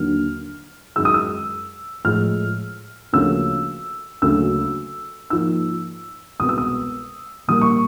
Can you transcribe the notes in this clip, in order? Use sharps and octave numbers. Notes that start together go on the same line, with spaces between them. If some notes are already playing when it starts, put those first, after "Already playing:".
Already playing: D#2 D3 F#3 A#3 F6
F#2 D#3 G#3 E6
D#6
E6
A2 F3 G#3 F6
D2 C#3 F3 A#3 E6
D2 C#3 F#3 A#3 E6
G#2 F3 A#3 E6
C2 B2 G#3 B3 D#6
E6
D#6
A#2 G3 A#3 D#6
C#6